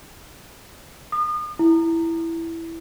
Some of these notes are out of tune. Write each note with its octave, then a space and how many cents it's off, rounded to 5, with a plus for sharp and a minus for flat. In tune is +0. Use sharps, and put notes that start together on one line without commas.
D#6 -35
E4 +5